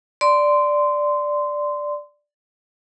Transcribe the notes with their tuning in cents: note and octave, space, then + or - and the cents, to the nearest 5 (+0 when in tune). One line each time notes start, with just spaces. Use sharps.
D5 +0 C6 -15